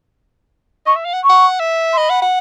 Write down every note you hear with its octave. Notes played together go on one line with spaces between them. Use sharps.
D#5 C#6
E5
F5
F#5
C#6
F#5
E5
C6
D#5 B5
F#5
F#5